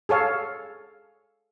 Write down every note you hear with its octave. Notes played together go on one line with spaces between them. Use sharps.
G#4 A4 C#5 F5